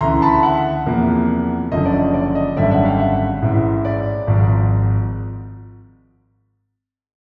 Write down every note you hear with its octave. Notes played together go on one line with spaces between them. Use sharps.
D2 C#3 E3 A#5 C6
A5 B5
E5 F#5
E2 C3 F3 A#3
F#1 F#2 D3 F3 D#5
D5
D#5
D5
D#5
G#1 F#2 D3 G3 D5 E5
E5 F#5
F5 G5
E5 F#5
A1 G#2 E3
D5 E5
G#1 G#2 F3 G#3